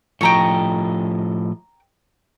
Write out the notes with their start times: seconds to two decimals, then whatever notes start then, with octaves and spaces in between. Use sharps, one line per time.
0.21 A2 F3 D#5 G5 A#5 C#6